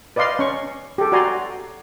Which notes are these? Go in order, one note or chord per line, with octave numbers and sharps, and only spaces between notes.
B4 D5 D#5 F5 C6
C#4 C#6
G4 A4
F#4 D5 G#5 A#5 C6